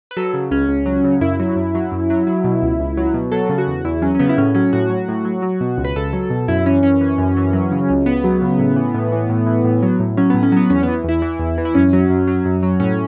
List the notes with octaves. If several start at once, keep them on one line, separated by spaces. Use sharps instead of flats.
B4
F#3 A4
C#3
C#2 C#4
C#2
F#3
C#3
F#2 E4
F#3
F#2
F#3
F#2
F#3
F#3
B2
C#2
C#2
F#3
B2
F#3 A4
C#3
F#4
E2
E2 E4
F#3 C#4
C#4
C#3 B3
E4
A2 C#4
F#3 C#4
A2 F#4
F#3
A2
F#3
F#3
B2
C#2
B4
C#2 A4
F#3
B2
F#2 E4
E3 C#4
F#2 C#4
E3
F#2
E3
F#3
C#3
C#2
C#2 B3
F#3
C#3
A2
E3
A2
E3
A2
E3
A2
F#3
A2
F#3 C#4
A2 B3
C#4
F#3 B3
E2 C#4
E3 B3
E2 E4
E3
E2
E3
E4
F#2 C#4
F#3
F#2
F#3
F#2
F#3
A2 C#4